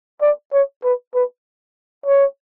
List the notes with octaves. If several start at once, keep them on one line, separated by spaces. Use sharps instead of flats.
D5
C#5
B4
B4
C#5